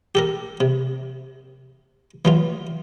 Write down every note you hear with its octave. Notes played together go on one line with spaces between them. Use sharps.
G4 A4 A#4
C3
E3 F#3 F4